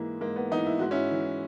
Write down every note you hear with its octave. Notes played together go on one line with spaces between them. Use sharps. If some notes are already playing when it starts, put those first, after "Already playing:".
Already playing: G#2 E3 A#3
G#2 A#3
B3
E3 B3 D#4
E4
G#2 F#4
C#4 E4
E3